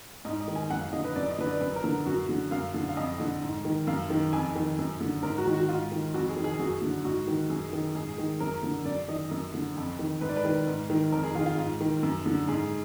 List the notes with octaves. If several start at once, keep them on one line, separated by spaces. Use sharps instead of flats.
G#2 D#5
D#5
D#3
G#5
F#2 F#5
F5
D3 D#5
B4
F#2 D5
D#5
D3 B4
D5
F#2 B4
A#4
D3
F#2 F#4
D3
F#2 F5
D3
F5
F2 D#5
D3
G#2
D#3
F#2 F5
D#3
F2 G#5
D#3
F#2
D3
G#2 A#4
F#4
D#3
F#4
G#2 F4
D#3
F2 F#4
G#4
D#3
G#4
F#2 F#4
D3
G#2 F#4
D#3
F#2 G#4
D#3
G#2 G#4
D#3
F#2 A#4
D3
F#2 D5
D#3 D#5
F#2
D3
F2
D#3
G#2 B4
D5
B4
D#3
G#2
D#3
F2 A#4
G#4
D#3 F4
F4
G#2
D#3
F#2
D3
G#2 G#4